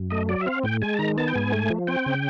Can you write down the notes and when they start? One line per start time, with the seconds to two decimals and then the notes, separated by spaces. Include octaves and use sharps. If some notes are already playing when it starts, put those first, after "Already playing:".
Already playing: F#2
0.10 A3 D#5
0.29 F#3 D5
0.41 E5
0.46 C4 F5
0.64 A2 G5
0.82 G#3 G#5
0.94 A5
0.99 D#3 A#5
1.18 B3 A5
1.27 G5
1.35 G#2 G#5
1.52 A3
1.70 F3
1.87 C4 G5
2.06 C#3